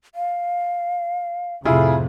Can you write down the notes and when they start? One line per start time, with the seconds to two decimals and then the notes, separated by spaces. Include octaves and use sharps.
0.15 F5
1.65 F2 A2 C3 E4 F4 G#4 B5